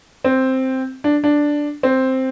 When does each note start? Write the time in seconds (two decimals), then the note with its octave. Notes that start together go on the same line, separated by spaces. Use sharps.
0.24 C4
1.04 D4
1.24 D4
1.83 C4